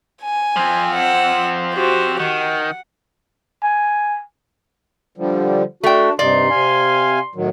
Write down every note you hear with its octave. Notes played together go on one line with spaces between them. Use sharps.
G#5
F3 C4
F#5 E6
F#4 G4 C5
D#3 F#5
G#5
D3 F3 G3
A3 D4 F#4 G5
G2 C3 D#4 D5 C6
C3 F5 G#5
A2 D#3 F#3